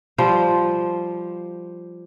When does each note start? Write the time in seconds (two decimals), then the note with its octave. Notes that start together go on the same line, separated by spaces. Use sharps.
0.18 F3 G3 C5